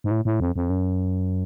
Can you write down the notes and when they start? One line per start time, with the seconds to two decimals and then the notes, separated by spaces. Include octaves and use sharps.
0.04 G#2
0.11 A2
0.25 A2
0.40 F2
0.56 F2
0.70 F#2